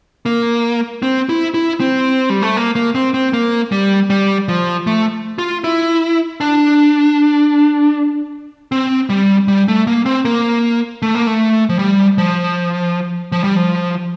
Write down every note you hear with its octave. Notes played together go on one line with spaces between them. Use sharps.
A#3
C4
E4
E4
C4
G3
A3
A#3
A#3
C4
C4
A#3
G3
G3
F3
A3
F4
E4
D4
C4
G3
G3
A3
A#3
C4
A#3
A3
A#3
A3
F3
G3
F3
F3
G3
F3